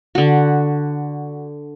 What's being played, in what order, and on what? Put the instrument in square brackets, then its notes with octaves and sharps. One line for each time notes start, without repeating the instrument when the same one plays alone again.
[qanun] D3 F#4